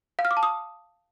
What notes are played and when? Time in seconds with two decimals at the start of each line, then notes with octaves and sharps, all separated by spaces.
0.19 F5
0.25 F6
0.31 D6
0.37 A5
0.43 D#6